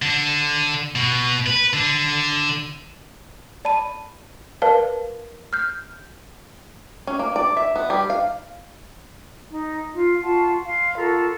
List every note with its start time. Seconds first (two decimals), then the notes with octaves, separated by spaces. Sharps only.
0.02 D3
0.95 B2
1.47 B4
1.73 D3
3.65 D5 A5 B5 D#7
4.62 A#4 B4 D5 F5 A5
5.53 F6 G6
7.07 C#4
7.19 A#3
7.36 D5
7.57 E5
7.76 B3
7.90 G3
8.10 F5
9.49 D#4
9.93 F4
10.22 F4 F#4 F#5 A5
10.64 F5 C6
10.96 F4 F#4 A4 A#4